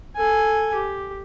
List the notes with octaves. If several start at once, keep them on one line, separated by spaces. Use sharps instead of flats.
A4 G#5
G4